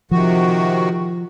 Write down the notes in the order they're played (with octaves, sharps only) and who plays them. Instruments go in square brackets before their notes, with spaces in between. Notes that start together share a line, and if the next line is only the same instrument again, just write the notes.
[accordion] C3 D#3 F#4 [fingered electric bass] F3